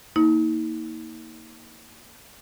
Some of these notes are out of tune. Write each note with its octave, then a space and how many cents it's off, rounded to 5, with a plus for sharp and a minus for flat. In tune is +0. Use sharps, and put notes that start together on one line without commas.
A#3 -5 D#4 +35